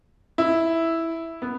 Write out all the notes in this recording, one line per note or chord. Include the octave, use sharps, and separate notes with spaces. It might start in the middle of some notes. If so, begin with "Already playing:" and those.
E4
B3